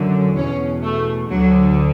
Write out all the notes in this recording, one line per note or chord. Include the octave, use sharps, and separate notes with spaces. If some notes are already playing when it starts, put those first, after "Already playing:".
Already playing: F#2 D3
E2 B2 C#4
A3
D2 D3 F#3